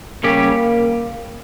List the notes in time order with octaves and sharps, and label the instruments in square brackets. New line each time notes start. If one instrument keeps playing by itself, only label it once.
[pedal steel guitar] C#3 G3 C#4 G4 [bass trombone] A#3